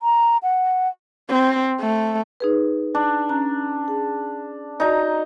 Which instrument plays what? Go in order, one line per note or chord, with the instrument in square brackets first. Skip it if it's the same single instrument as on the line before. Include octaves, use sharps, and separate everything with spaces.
[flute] A#5
F#5
[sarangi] C4
A3
[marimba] D#4 G#4 B4
[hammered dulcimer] D4
[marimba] C#4 A#5 F#6
G#4
[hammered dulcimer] D#4 A#5 [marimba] F#4 D5